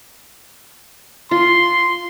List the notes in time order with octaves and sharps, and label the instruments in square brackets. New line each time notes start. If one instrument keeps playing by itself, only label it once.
[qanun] F4 [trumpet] C6